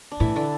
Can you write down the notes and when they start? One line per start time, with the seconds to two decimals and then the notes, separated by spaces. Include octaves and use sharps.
0.12 D4
0.20 A2 E3 E4
0.36 D3 D4